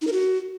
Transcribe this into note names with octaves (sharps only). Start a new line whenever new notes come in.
D#4
A#4
F#4